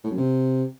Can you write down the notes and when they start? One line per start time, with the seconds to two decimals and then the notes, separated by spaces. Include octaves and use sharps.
0.04 A2
0.11 F#2
0.17 C3